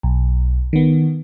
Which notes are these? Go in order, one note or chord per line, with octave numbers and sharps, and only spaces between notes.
B1
D#3 B3